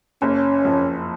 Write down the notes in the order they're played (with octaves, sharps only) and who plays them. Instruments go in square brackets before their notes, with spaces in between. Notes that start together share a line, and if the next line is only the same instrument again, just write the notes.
[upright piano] F#1 [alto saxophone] C#4
[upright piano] F2